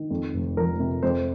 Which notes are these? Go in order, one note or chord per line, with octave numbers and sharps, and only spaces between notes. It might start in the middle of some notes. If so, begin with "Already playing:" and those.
Already playing: D#3
F2
F1
F3 A#4
C3
F2 C5